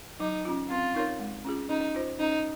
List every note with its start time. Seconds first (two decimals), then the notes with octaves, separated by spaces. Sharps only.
0.20 F#3 D#4
0.45 C#4 F4
0.70 C4 F4
0.94 D#4 A#4 C#5
1.19 G#3
1.45 C#4 F4 G#4
1.69 C#4 D#4
1.95 F4 C5
2.19 C#4 D#4